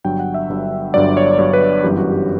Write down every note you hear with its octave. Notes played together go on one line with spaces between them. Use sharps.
G1 G2 F#3 G5
F#5
E5
G1 G2 F#3
G1 G2 F#3 D5
C#5
G1 G2 F#3 C#5
B4
G1 F#2 E3 G3 G4
F#4
G4